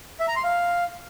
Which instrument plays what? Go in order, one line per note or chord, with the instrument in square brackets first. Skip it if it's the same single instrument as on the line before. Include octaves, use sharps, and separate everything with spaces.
[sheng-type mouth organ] E5
A#5
C6
F5